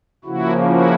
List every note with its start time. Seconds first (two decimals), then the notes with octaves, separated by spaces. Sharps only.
0.25 C#3 F3 A#3 E4 F#4
0.66 E4 F#4